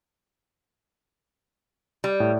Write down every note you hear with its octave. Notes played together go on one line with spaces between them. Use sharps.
G3
A2